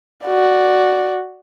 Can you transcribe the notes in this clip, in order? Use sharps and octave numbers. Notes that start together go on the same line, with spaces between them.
F#4 D5